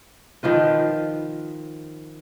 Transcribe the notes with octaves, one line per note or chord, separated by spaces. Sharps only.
D#3 F3 F4 B4